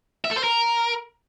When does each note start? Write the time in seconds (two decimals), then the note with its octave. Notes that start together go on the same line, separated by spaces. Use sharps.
0.25 E5
0.31 A4
0.37 C5
0.44 A#4